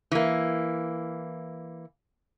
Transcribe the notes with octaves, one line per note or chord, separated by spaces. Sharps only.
E3 A#3